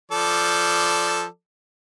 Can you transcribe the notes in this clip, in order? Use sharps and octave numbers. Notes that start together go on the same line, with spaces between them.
F3 A4 D5